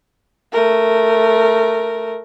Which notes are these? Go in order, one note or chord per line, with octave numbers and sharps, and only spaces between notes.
A3 A#4